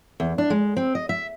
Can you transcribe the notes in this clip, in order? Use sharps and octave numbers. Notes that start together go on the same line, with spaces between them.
E2
D4
G#3
C4
D#5
E5